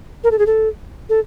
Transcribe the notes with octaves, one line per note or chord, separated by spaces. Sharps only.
A#4
A4
G#4
A4
A4